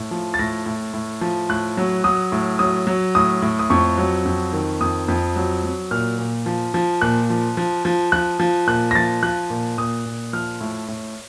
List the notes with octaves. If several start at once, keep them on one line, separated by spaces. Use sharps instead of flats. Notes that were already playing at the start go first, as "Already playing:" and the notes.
Already playing: A2
F3
A6
A2 A#6
A2
A2
F3
A2 F#6
F#3
F#3 D#6
A2
F#3 D#6
F#3
A2 D#6
A2
D#6
F2 C#6
F#3
F2
D#3
F2 D#6
F2
F#3
F#3
A#2 F6
A#2
F3
F3
A#2 F#6
F3
F3
F3
F3 F#6
F3
A#2 F#6
A#6
F3 A6
F3 F#6
A#2
A#2 D#6
A#2
F3 F6
A2
A2